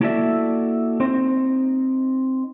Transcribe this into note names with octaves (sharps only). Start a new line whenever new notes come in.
A#3 E4 F#4 A4 D5 E5
C4 D#4 C5